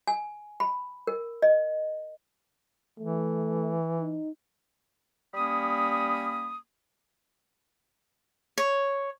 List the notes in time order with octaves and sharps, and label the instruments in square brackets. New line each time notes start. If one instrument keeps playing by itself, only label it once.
[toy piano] G#5
B5
A#4
D#5
[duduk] E3 [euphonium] A3
[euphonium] D#4
[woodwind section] G3 A#3 C#4 B5 D#6
[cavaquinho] C#5